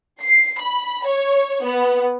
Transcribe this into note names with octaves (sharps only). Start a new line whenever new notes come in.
C7
B5
C#5
B3